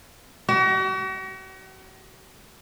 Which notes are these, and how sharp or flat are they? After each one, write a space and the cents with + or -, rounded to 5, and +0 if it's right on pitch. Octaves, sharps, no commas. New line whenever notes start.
F#4 +40